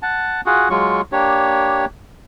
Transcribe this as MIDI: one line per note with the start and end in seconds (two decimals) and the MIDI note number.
0.02 0.41 78
0.02 0.41 81
0.46 0.69 65
0.46 0.69 66
0.46 0.69 68
0.46 0.69 78
0.70 1.01 54
0.70 1.01 56
0.70 1.01 65
0.70 1.01 85
1.12 1.85 58
1.12 1.85 62
1.12 1.85 67
1.12 1.85 73